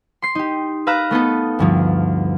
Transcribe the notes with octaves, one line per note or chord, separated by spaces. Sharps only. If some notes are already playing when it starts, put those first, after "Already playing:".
C6 C7
D#4 G4
B4 F5 A#5 E6 F#6
A3 B3 D#4 A4
D2 G2 F3